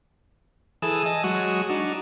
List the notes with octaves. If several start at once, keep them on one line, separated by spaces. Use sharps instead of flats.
E3 G#4 A4 D#6
D#5 G#5 A5
F#3 G#3 F#4 D#6
D4 D#4 F#4